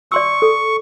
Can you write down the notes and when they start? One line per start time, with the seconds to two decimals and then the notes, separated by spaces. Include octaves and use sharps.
0.12 D5 C6 C#6 E6
0.42 A4